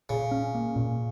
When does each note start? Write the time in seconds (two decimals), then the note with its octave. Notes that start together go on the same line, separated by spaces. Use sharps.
0.09 A#2 C#3
0.31 C#4
0.55 A#3
0.76 A#2